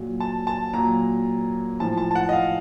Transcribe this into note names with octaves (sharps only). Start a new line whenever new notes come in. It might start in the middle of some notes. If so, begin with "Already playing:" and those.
Already playing: A#2 F#3
A5
A5
A#2 F#3 A#5
A2 F3 A5
A5
A5
F#5
D#5
F5